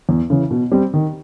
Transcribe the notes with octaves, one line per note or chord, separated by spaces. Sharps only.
E2
C#3 E3
B2
G3 C4
D#3